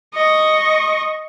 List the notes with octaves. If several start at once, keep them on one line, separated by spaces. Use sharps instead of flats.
D#5 C#6